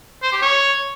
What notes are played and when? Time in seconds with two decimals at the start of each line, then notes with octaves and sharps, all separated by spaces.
0.23 C5
0.32 G4
0.42 C#5